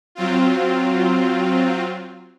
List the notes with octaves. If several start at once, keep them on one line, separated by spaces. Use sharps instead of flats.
F#3 C4 F4